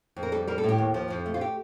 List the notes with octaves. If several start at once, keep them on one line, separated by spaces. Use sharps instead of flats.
F2
A#4
G3 A4
G3 A#4
A4
A2 G4
D#2
F3
F2
A3
F4
G4